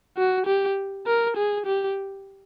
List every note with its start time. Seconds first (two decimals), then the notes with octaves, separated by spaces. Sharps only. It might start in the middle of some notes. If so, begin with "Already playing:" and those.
0.17 F#4
0.47 G4
1.07 A#4
1.37 G#4
1.66 G4